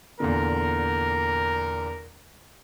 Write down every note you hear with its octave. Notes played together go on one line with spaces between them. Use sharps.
E2 A#2 D3 A#4